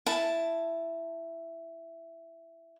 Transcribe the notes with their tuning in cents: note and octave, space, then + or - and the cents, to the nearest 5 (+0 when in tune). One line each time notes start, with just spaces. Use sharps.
E4 +10 A5 +0